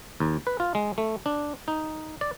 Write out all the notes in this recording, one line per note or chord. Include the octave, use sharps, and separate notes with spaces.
D#2
B4
F4
G#3
A3
D4
D#4
D5